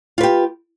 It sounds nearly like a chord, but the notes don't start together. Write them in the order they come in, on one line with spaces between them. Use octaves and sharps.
F4 B4 G4